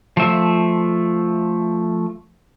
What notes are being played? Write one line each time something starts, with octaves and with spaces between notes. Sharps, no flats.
F3 A3 E5